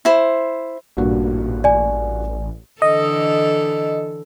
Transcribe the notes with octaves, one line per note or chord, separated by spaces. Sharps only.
E4 C5
A1 G2 A#2 F#4
D5 G#5
D3 E3 A4 D#5